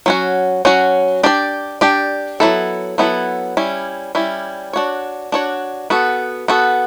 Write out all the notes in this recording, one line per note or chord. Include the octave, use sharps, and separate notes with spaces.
F#3 C#4 F#4
F#3 C#4 F#4
D4 G4 D5
D4 G4 D5
F#3 B3 E4 A4
F#3 B3 E4 A4
G3 C#4 E4
G3 C#4 E4
D4 F#4 C#5
D4 F#4 C#5
B3 F#4 A4
B3 F#4 A4